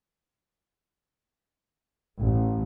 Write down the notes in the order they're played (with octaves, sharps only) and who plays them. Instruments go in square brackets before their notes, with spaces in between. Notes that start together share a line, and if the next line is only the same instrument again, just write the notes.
[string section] A1